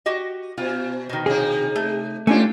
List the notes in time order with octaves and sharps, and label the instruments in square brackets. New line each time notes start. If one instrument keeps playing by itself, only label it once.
[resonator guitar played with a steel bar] F#4 G4 D#5
[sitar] B2 [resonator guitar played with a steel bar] F4
[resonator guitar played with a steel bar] B2 D#3
[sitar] C3 D#4 [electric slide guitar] G#4
[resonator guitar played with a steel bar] A3
[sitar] G#2 D4 G4 [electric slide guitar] A3 C#4 F4 [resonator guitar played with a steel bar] G#5